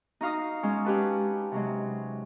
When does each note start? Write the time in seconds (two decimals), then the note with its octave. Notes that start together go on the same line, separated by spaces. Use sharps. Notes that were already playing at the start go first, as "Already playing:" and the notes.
0.21 D#4 F#4 F5 D#6
0.63 G#3 C#4
0.85 C#4 G4 B4 A5
1.52 C3 F#3 G#3